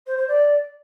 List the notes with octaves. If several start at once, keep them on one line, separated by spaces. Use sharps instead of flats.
C5
C5
D5